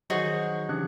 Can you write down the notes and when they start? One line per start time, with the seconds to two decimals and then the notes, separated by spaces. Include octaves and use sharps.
0.10 D#3 F#3 D#4 F#4 G#4 C5 F#5 C#6
0.69 C#3 E3 D4 G4 F#6